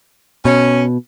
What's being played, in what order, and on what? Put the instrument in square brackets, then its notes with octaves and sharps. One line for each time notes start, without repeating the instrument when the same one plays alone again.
[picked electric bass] B2 [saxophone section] C#4